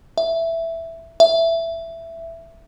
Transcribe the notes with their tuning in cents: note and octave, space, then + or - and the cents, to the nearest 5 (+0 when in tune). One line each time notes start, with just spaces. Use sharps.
E5 +5
E5 +10